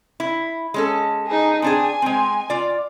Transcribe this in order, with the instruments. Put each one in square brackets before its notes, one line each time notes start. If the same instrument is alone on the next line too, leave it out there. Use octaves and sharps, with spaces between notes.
[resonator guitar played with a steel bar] E4
G#3 C#4 A4
[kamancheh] D#4 G#4
[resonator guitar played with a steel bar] C4 D4 G#4 [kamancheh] G#5
[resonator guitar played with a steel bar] G#3 C4
F4 D5